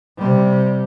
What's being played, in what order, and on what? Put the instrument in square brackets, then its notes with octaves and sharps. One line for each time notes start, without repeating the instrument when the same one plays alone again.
[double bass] C3 G3